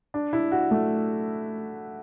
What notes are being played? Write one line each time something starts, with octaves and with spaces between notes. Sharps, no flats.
D4
E4
F#4
A3